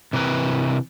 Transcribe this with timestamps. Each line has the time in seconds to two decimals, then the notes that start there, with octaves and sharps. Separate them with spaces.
0.13 C3 E3 A#4 B4